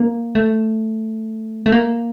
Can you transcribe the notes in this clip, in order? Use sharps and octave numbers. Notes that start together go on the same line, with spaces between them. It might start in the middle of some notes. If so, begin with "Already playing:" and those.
Already playing: A#3
A3
A3
A#3